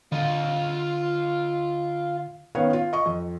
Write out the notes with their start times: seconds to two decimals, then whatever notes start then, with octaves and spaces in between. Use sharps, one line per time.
0.12 D3 F4 D#5
2.55 D#3 B3 C#4 C#5 F5
2.73 F4
2.93 D#5 C#6
3.06 F2